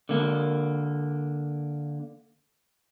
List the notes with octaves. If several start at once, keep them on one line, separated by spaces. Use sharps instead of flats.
D3 A#3